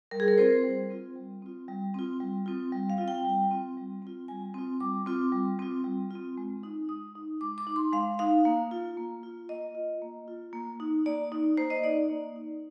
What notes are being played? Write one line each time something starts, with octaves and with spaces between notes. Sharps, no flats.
G3 A#4
G#4
A#4
C4 F4 C5
G3
C4 F4
G3
C4 F4
G3
C4 F4
G3
C4 F4
G3
F5
C4 F4
G5
G3
C4 F4
G3
C4 F4
G3 G#5
C4 F4
G3 D6
C4 F4
G3
C4 F4
G3
C4 F4
G#3
D#4
G#3 D#6
D#4
G#3 D6
D6
D#4
C6
G#3 F5
D#4 F5
A#3
F4
A#3
F4
A#3 D#5
F4
A#3
F4
A#3
D#4
A#3 D5
D#4
A#3 C5
D#5
D#4 D5
A#3
D#4